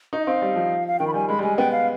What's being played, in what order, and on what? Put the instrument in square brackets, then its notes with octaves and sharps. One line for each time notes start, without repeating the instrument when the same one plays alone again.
[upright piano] D#4
[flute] D#5
[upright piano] C4 [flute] F5
[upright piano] G3
F3
[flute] F5
[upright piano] D#3 [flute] G5
[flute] B5
[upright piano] G3 [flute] G#5
[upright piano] G#3 [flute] B5
[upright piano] G3
[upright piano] G#3 [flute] G#5
[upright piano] B3 [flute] G5
[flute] F5